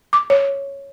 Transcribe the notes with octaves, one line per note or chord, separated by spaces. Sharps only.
D6
C#5